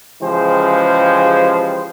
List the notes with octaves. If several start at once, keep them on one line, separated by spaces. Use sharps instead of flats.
C#3 E3 F3 G#3 G4 C5